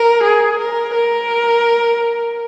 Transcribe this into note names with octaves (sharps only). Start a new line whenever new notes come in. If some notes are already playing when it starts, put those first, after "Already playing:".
Already playing: A#4
G#4
A#4
A#4